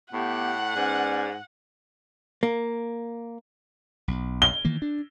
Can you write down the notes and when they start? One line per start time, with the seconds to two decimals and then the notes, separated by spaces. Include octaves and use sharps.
0.13 A2 A3 B3 G4 F#5
0.75 G#2 B3 C#4 D5
2.43 A#3
4.08 B1
4.42 G7
4.65 D#3 E3 A#3
4.82 D4